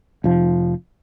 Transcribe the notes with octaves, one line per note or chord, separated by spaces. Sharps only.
F1 F3